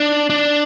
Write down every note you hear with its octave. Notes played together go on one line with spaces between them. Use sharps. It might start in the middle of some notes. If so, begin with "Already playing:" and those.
Already playing: D4
D4